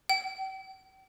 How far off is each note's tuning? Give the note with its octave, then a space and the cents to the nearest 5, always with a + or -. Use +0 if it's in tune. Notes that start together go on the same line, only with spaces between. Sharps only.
G5 -40